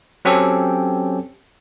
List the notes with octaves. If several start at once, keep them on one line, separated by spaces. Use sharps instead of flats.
F#3 C4 C#4 G4 A4